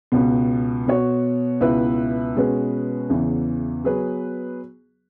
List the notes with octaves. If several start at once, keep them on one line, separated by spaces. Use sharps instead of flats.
C#2 B2 B3
B2 B3 F#4 C#5
C#2 B2 B3 E4 B4
B2 G#3 C#4 F#4 B4
E2 C#3 E3 B3
F#3 B3 G#4 B4